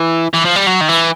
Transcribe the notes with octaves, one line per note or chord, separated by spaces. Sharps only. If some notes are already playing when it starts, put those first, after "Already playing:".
Already playing: E3
E3
F3
G3
F#3
D#3
E3